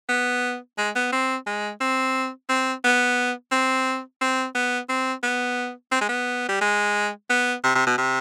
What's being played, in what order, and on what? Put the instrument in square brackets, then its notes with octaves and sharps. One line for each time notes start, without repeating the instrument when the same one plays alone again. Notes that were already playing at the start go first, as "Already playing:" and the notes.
[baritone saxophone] B3
G#3
B3
C4
G#3
C4
C4
B3
C4
C4
B3
C4
B3
C4
G#3
B3
G3
G#3
B3
C3
C3
B2
C3